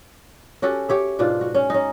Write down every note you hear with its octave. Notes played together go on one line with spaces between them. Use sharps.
C#4 F#4 G4 A4
G4 C#5 E5
G#2 B2 D4 F4
F#4
C#4
C#4 D#4